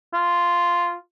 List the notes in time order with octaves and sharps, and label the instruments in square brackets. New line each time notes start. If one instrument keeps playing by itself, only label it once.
[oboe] F4